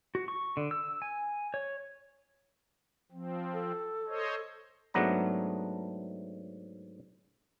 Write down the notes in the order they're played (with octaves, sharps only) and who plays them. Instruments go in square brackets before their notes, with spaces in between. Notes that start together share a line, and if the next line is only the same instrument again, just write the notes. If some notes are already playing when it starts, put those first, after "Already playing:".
[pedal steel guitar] F#4
C#6
D3
E6
G#5
C#5
[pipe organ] F3 C4
[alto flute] A4
[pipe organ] C5 C#5 D#5
[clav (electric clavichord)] G#2 F#3 A3 B3 D4 A#5